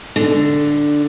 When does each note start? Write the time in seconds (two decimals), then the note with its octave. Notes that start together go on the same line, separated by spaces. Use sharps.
0.16 D3